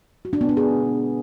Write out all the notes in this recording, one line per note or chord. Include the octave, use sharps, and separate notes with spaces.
F#4
D4
B3
D4
G#4